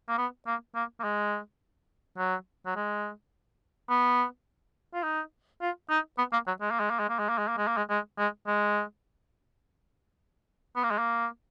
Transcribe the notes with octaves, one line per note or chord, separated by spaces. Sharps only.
A#3
B3
A#3
A#3
A#3
G#3
F#3
F#3
G#3
B3
F4
D#4
F4
D#4
B3
A#3
F#3
G#3
A#3
G#3
A#3
G#3
A#3
G#3
A#3
G#3
A#3
G#3
A#3
G#3
G#3
G#3
G#3
B3
A#3
G#3
A#3